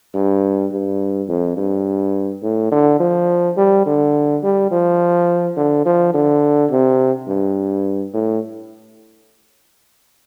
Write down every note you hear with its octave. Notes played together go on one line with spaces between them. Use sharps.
G2
G2
F2
G2
A2
D3
F3
G3
D3
G3
F3
D3
F3
D3
C3
G2
A2